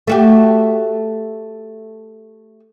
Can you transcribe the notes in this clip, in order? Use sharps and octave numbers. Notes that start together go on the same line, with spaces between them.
A3 F#4 G4